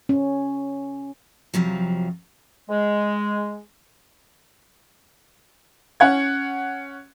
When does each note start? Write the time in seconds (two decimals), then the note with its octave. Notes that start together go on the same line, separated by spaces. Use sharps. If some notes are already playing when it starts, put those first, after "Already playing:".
0.09 C#4
1.54 F2 C3 F3 F#3
2.69 G#3
6.00 C#4 F#5 G#6